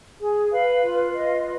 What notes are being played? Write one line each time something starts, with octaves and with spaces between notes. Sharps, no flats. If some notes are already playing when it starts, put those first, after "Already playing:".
G#4
B4 F5
F4
B4 D#5
B4